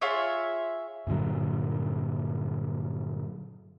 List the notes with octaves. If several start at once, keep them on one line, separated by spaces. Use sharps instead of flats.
F4 G#4 C#5 E5
G2 A#2 D3 F#3